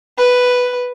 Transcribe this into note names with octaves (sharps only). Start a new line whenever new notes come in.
B4